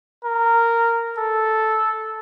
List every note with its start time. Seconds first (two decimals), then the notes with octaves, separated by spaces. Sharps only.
0.24 A#4
1.18 A4